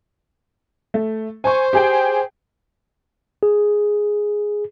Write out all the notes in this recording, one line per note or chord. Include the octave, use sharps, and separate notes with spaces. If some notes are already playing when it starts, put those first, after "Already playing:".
A3
C5 G#5 C#6
G4 G#4 G5
G#4